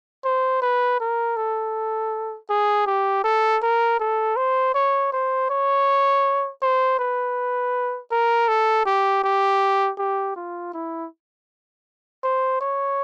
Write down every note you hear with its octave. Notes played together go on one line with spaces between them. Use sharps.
C5
B4
A#4
A4
G#4
G4
A4
A#4
A4
C5
C#5
C5
C#5
C5
B4
A#4
A4
G4
G4
G4
F4
E4
C5
C#5